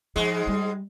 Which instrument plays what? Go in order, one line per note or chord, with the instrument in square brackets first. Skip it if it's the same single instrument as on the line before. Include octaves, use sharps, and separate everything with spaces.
[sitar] G#2 G#3 [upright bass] F3
[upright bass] G3